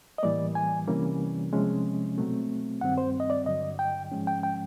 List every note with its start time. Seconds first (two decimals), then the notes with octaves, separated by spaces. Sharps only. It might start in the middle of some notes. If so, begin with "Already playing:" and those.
0.18 D#5
0.23 A2 E3 G3 A#3 D5
0.55 G#5
0.88 C3 E3 G3 A#3 C#4
1.53 C3 F3 G#3 C#4
2.18 B2 F#3 A3 C4
2.81 G2 D#3 G3 C4 F#5
2.98 C5
3.20 D#5
3.30 D5
3.46 G2 D3 F#3 D#5
3.79 G5
4.12 G#2 F3 G#3 C#4
4.27 G5
4.43 G5